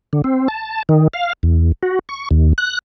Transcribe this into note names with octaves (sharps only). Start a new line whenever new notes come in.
D3
C4
A5
D#3
F5
E2
F#4
C#6
D#2
F#6